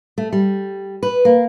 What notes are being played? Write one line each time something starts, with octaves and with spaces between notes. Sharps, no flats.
A3
G3
B4
A#3